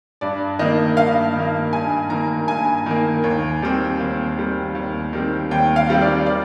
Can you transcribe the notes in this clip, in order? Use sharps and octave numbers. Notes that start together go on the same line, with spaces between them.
G2 D5
D#3 A#3 D#5
G2 F5
D#3 A#3
G2 G#5
D#3 A#3 A#5
G2 G#5
D#3 A#3
D#2
D#3 G3 C4
D#2
D#3 G3 C4
D#2
D#3 G3 C4
D#2 G5
F5
D#3 G3 C4
D5
D5